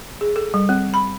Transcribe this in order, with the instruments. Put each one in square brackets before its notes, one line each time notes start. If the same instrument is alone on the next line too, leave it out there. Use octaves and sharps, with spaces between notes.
[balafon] G#4
A4
G3
C4
B5